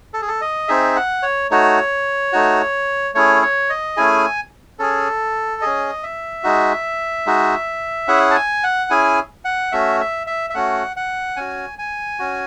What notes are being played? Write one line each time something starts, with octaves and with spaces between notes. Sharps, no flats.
A4
G#4
A4
D#5
C4 D#4 G#4 E5
F#5
C#5
A3 D#4 F#4 C#5
A3 D#4 F#4
A3 C#4 E4 G#4 C#5
C#5
D#5
A3 C#4 E4 G#4 G#5
C#4 G#4 A4
C#4 G#4 D#5
E5
G#3 D#4 F#4
G#3 D#4 F#4
C#4 E4 G#4 F#5
A5
G#5
F#5
C#4 E4 G#4 G#5
F#5
A3 C#4 F#4 E5
E5
E5
E5
A3 C#4 F#4 F#5
F#5
C#4 F#4 G#5
G#5
C#4 F#4